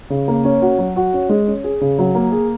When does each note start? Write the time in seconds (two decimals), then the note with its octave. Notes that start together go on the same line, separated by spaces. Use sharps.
0.10 C#3
0.28 A#3
0.44 C#4
0.62 F#4
0.78 F#3
0.96 F#4
1.13 C#4
1.29 G#3
1.47 C#4
1.64 G#4
1.81 C#3
1.99 F#3
2.15 A#3
2.32 G#4